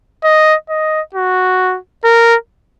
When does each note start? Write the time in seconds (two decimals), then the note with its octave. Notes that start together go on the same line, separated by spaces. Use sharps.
0.24 D#5
0.69 D#5
1.15 F#4
2.04 A#4